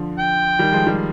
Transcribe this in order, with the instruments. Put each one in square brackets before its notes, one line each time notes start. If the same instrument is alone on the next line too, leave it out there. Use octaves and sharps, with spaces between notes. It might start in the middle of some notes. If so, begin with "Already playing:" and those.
Already playing: [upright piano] D3 F3
[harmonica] G5
[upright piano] D#3 G3
F3 G#3
D#3 G3